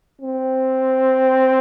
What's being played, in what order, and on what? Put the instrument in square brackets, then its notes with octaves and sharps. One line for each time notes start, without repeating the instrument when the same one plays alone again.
[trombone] C4